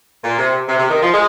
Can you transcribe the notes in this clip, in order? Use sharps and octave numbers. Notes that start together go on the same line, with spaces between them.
A#2
C3
C3
C3
D#3
F3
G#3